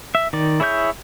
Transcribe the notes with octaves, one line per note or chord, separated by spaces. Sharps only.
E5
D#3 D5
E4 G#4 C#5 E5 G6